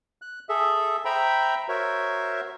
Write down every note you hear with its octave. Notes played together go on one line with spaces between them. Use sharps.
F#6
G#4 A4 E5
C5 E5 G5 A#5 B5
F#4 A#4 C5 C#5 E5